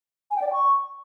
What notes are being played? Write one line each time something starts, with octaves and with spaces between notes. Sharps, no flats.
G#5
G5
D5
G5
C#6